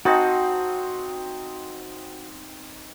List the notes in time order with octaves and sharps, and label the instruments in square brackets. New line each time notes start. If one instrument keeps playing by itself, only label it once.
[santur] C4 D#4 A5 [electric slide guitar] F#4